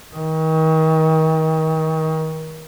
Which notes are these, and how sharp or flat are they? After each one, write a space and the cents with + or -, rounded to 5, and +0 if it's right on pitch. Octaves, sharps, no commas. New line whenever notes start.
D#3 +35